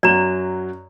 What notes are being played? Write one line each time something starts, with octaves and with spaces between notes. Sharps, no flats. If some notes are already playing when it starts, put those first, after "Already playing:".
F#2 F#3 D5 A#5